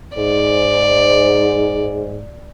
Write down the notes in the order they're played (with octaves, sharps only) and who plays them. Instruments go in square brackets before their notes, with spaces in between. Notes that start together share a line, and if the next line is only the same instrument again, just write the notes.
[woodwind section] G#2 [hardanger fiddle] D5